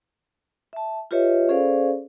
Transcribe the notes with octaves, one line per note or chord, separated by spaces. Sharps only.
E5 A5
F4 G4 B4 C#5 D#5 E5
C#4 G#4 A4 C5 D5 F5